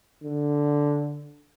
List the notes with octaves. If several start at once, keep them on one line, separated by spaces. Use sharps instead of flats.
D3